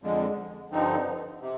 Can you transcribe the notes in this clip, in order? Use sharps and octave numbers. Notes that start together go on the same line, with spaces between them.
F2 D3 G#3
G2 D3 F3 C4 D#4
C3